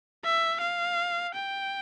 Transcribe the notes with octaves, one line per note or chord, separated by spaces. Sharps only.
E5
F5
G5